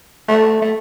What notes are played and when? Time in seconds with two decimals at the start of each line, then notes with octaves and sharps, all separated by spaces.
0.28 A3
0.62 A3